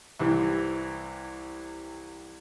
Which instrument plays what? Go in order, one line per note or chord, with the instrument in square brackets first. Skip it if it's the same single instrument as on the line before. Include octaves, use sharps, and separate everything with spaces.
[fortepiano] C2 C3 E3